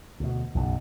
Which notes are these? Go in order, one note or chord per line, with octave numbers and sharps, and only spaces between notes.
D2 B2
B1 F#2 C#3